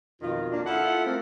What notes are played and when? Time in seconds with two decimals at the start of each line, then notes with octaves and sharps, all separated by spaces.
0.22 F2 B2 D#3 F4
0.52 A#3 D4
0.66 E4 F4 A4 E5 F#5
1.05 A3 A#3 C4